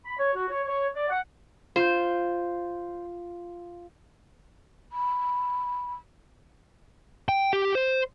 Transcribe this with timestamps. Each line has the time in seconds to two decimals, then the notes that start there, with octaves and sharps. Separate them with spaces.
0.05 B5
0.19 C#5
0.35 F#4
0.50 C#5
0.67 C#5
0.95 D5
1.09 F#5
1.76 F4 C5
4.92 B5
7.29 G5
7.53 G4
7.75 C5